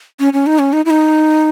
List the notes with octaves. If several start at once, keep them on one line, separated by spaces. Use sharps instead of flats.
C#4
C#4
D#4
C#4
D#4
E4
D#4